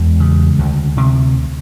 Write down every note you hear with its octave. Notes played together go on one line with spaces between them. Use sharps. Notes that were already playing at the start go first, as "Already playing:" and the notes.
Already playing: E2 G#3
C#3
D2
C3